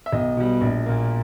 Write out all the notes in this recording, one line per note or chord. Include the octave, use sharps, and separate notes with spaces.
E5
B1 D#5
B2 G3
A#1
A#2 A#3